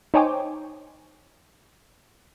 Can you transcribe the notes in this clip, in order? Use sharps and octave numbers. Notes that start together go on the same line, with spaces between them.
D#4 C5 C#5 G5 G#5 D6